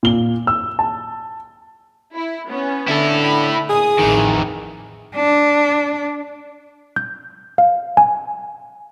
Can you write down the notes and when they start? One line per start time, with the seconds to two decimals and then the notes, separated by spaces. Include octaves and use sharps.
0.03 A#2 G7
0.47 E6
0.79 A5
2.14 E4
2.47 B3 C#4
2.88 D3 E4 A4
3.22 B5
3.69 A#2 G#4 D#6
3.99 A1 F2 D#3 E3
5.16 D4
6.96 G6
7.58 F5
7.97 G#5